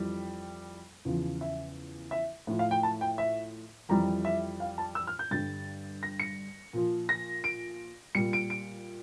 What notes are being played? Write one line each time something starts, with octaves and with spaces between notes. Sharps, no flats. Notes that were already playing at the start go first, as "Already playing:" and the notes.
Already playing: F2 E3 G3
E2 C#3 F3
E5
E5
A2 F3
F5
G5
A5
G5
E5
F2 E3 G3 A#5
E5
F5
A5
E6
F6
G6
G2 D3 G3 A6
A#6
C#7
A#2 F3
A#6
D7
A#2 G3 C#7
D7
D7